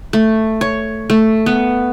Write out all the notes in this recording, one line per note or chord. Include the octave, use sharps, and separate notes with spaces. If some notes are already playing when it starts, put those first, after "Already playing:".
A3
C#5
A3
B3